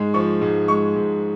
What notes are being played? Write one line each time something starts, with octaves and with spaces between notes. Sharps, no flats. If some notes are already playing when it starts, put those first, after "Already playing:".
Already playing: G#2 G#3
F3 C#6
G#2
G#3 C#6
G#2